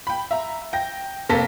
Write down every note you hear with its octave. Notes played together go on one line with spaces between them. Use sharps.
G5 B5
E5 A#5
G5 A#6
F1 A#3 A4 A#6 B6